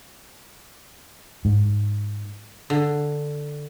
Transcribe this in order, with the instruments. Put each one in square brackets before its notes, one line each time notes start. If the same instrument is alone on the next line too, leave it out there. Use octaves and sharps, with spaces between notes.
[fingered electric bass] G#2
[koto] D3